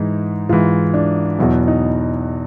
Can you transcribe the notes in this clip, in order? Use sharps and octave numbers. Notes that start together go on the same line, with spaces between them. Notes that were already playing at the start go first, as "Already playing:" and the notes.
Already playing: G#2 E3 D#4
G#2 E3 F4
D4
E2 B2 F#3 E4
D#4